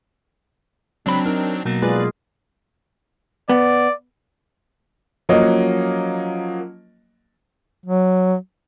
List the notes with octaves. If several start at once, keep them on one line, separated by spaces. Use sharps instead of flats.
C#2 F#3 C4 D4 B5
D#4 A#4
B2 F#3 A#3
G#3 F4 G#4 B4 D5
B3 D5
F3 F#3 A#3 C#4 D#5
F#3